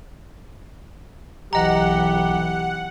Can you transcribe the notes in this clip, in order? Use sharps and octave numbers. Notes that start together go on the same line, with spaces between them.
B1 E3 G4 D#5 F#5 A#5